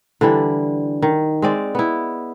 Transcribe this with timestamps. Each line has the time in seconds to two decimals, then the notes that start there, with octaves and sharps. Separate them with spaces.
0.21 D3 E3 G3 D4
1.02 D#3
1.42 G#3 C4 D5
1.75 B3 E4